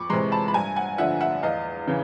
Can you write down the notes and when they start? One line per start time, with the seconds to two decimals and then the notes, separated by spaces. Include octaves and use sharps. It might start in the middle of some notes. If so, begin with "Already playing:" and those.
Already playing: F2 B5 C#6 D6
0.10 C3 E3 G#3 A#5 C6
0.32 A5 B5
0.48 B5
0.54 G2 G#5 A#5
0.76 F#5 G#5
0.98 D3 F3 E5 F#5
1.20 E5 F#5
1.43 E2 D#5 F5
1.87 C#3 E3